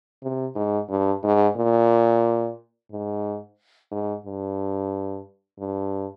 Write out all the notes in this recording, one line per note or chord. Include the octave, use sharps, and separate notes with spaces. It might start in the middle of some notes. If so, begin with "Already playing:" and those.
C3
G#2
G2
G#2
A#2
G#2
G#2
G2
G2